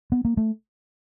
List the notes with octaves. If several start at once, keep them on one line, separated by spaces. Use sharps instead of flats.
B3
A#3
A3